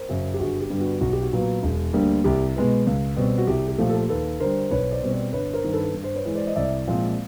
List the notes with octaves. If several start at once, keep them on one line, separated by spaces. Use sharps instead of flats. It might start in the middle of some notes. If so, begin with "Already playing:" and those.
Already playing: A#4 C5
F#2 C#3 F#3
G4
G1 F#4 G#4
G4
G2 D3 G3 B3
F#4
B1 F#4
G4
F#4
A#2 F#3 B3
E1
D2 D3 G3 A#3
C2 G4
B2 G#3 B3
C#2
B2 G3 C4
F#4
C2 G4
G4
A#2 F3 A3
G4 A4
D#2 A4 B4
D3 G3 A#4 C5
B1 B4 C#5
C5 D5
B2 G3 C4
C5 D5
G1 B4 C#5
A#4 C5
G2 D#3
A4 B4
G2
C5
B4 C#5
E3 G#3
C5 D5
D#5
C2 D5 E5
A#2 F3 G#3 C4